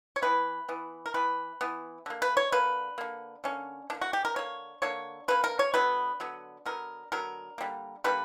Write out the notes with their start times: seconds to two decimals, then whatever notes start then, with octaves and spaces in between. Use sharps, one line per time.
0.16 C#5
0.22 E3 B3 B4
0.68 E3 B3
1.06 A#4
1.14 E3 B3 B4
1.61 E3 B3
2.06 D3 A#3
2.22 B4
2.37 C#5
2.52 D3 A#3 B4
2.98 D3 A#3
3.44 D3 A#3 C#4
3.90 D3 A#3 D4
4.01 F#4
4.13 G4
4.25 A#4
4.36 D3 A#3 C#5
4.82 D3 A#3 C#5
5.28 D3 A#3 B4
5.44 A#4
5.59 C#5
5.74 D3 F#3 B3 B4
6.20 D3 F#3 B3
6.66 D3 F#3 B3 A#4
7.12 D3 F#3 B3 A#4
7.58 D3 G3 A#3
8.04 D3 G3 A#3 B4